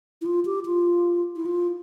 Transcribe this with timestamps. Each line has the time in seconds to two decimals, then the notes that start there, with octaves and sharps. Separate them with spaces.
0.21 E4
0.26 F4
0.45 G4
0.65 F4
1.36 E4
1.46 F4